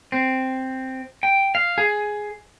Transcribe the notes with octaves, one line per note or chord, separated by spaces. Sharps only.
C4
G5
F5
G#4